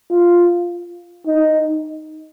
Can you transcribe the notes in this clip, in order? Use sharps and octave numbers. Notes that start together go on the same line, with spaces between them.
F4
D#4